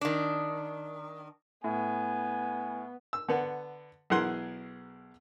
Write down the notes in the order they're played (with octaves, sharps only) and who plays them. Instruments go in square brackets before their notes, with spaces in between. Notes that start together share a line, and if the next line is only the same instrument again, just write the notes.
[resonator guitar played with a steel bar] D#3 D4
[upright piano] A2 [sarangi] B3 [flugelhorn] G#5
[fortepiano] E6
D3 B3
B1 E3 G#4 A#4 F#5 C6